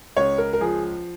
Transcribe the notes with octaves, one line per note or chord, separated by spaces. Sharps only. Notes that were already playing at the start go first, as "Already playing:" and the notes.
C#2 C#5
A#4
A#4
F3 G#4